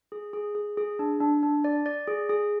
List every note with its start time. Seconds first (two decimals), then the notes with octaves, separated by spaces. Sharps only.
0.12 G#4
0.33 G#4
0.55 G#4
0.77 G#4
0.99 D4
1.20 D4
1.43 D4
1.64 D5
1.86 D5
2.07 G#4
2.29 G#4